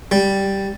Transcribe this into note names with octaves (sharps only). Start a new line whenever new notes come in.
G3